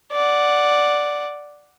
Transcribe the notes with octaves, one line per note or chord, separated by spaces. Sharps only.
D5 F#5